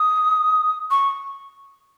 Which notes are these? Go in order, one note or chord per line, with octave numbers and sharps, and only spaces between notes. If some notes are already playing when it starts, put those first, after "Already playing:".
Already playing: D#6
C#6